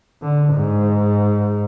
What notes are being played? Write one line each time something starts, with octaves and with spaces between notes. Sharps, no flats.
D3
G#2